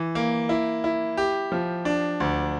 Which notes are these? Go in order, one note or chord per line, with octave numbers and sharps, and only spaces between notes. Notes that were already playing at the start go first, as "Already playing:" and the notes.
Already playing: E3
A#3
E4
E4
G4
F3
D4
D2